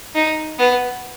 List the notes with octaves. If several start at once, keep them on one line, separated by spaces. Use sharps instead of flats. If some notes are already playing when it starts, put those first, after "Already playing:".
D#4
B3